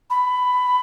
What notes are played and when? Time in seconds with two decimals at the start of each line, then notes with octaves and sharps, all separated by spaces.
0.10 B5